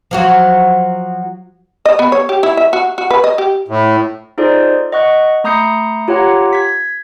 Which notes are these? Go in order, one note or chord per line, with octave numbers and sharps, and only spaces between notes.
F3 F#3 F#4
D#5
B3
C#5
G4
E4
E5
F#4
F#4
B4
D#5
G4
A2
D#4 F4 G#4 A4 C5 D5
D#5 F#5 C#6 F#6
A3 A#5 D#6 G6 C7 C#7
F4 G4 C#5 F#5 A#5
G#6 B6